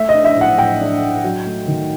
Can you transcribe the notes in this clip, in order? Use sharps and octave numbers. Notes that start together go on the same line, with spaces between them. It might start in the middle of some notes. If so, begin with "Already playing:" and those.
Already playing: A3 E5
D#5
D4
E5
A2
F#5
A2 G5
D4
A2
F#3
A3
D#3